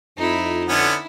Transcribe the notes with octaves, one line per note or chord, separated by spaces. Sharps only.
F2 D#4 E4
D3 B3 C#4 E4